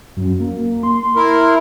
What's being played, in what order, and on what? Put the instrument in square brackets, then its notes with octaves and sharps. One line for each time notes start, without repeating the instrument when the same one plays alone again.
[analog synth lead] F#2
A#3
C6
[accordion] E4 A#4